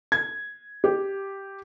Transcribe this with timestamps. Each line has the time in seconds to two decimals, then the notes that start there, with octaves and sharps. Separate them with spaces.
0.12 G#6
0.84 G4